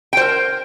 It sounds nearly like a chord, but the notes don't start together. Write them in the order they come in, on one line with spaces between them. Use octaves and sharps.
G5 C5 A#4